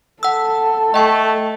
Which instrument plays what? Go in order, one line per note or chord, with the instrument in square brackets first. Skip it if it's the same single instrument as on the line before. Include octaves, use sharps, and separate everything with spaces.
[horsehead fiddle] A4 [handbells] F#5 E6
[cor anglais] A3 [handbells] D#5 G5 C#6